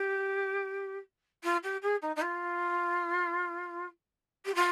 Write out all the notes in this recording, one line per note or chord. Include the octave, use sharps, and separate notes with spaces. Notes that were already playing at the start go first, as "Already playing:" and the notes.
Already playing: G4
F4
G4
G#4
D#4
D#4
F4
G4
F4